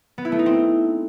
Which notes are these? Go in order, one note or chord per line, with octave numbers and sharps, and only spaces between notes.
B3
E4
A3
D#4
C4